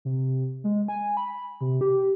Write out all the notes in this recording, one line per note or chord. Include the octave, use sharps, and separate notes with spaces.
C3
G#3
G#5
B5
C3
G4